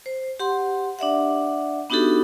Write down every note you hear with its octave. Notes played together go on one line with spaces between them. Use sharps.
C5
G4 F#5 C6
D4 D5 E5 F#5
B3 D4 D#4 F#4 G4 A4